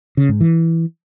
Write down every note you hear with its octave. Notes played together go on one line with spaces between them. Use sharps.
C#3
G#2
E3